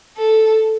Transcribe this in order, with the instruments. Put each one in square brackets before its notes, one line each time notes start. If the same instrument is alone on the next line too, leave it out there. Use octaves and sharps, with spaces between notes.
[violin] A4